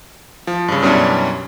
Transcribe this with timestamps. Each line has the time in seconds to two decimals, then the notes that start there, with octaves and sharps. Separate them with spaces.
0.47 F3
0.68 G2 C#3
0.82 F#2 B2 G3 C#4 D4 E4